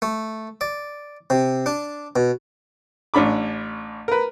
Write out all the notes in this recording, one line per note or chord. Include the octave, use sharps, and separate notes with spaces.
A3
D5
C3
D4
B2
A1 C#4 D4 B5 D6
A#4 B4